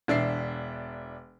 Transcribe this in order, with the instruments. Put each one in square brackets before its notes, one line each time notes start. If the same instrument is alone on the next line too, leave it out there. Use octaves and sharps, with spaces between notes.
[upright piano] E1 D4 E5 C7